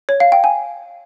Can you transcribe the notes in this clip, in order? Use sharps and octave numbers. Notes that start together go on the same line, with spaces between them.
C#5
F5
G5
G#5